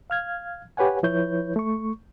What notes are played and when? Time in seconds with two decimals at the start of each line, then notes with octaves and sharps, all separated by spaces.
0.10 F5 F6 G#6
0.77 G4 B4 C#5 F#5 G#5
1.03 F3 E4 B4 C#5 G6
1.56 A3 C#6